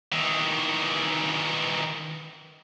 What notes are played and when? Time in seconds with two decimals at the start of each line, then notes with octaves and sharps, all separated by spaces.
0.12 D#3 E3